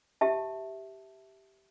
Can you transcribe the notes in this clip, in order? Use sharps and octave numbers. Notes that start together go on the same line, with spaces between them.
G4 E5 A5